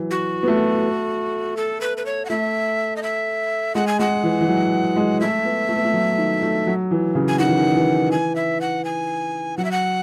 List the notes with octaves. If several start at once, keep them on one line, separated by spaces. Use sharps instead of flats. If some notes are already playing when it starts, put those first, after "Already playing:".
Already playing: E3 F#3
F#4
B3
A3
A4
B4
B4
C#5
F#5
A3 E5
D#5
E5
G#3 F#5
G#5
G#3 F#5
E3
E3
F#3
G#3
A3 E5
B3
A3
B3
A3
F#3
D#3
A3
F#3
E3
C#3
G#5
D#3 F#5
E3
D#3
E3
G#5
E5
F#5
G#5
F#3 F#5
E5
F#5